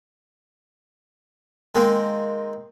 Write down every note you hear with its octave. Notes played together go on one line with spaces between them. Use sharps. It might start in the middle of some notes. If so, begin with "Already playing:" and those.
D#3 G#3 A#3 C4